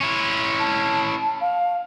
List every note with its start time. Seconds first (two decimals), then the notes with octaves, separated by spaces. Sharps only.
0.01 C#4 E4
0.59 A5
1.40 F5